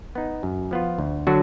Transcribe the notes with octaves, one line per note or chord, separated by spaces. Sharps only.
B3 D#4
F#2
F3 B3 F4
D2
D3 F#3 D4 F#4